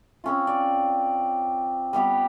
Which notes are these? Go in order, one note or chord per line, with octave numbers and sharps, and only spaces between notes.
C4 C#4 F4
D5
G3 B3 G4